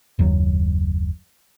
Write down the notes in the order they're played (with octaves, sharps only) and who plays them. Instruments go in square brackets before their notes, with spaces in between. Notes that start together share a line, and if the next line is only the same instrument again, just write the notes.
[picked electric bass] F#1 D#2 F#3